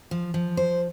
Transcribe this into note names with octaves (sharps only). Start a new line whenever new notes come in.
F3
F3
C5